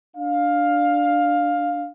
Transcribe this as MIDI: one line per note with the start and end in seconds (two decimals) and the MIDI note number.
0.17 1.90 62
0.17 1.90 77